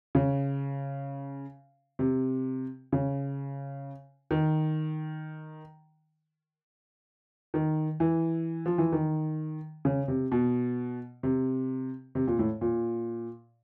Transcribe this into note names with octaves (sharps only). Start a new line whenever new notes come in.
C#3
C3
C#3
D#3
D#3
E3
F3
E3
D#3
C#3
C3
B2
C3
C3
A#2
A2
A#2